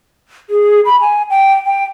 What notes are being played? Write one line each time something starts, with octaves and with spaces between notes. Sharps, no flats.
G#4
B5
G#5
G5
G5